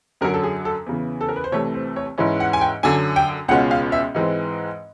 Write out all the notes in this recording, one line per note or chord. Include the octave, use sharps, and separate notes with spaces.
F#2 D3 F#3 A#4
A4
G#4
A4
E2 C#3 E3
A4
A#4
B4
C5
C2 C3 E3 A3 C#5
C5
C#5
G#2 E3 G#3 C#4 E4
F#5
G#5
G5
F#2 D3 F#3 G#5
G5
C#2 B2 G#3 C#4 F4 F#5
F5
E5
G#2 E3 G#3 C4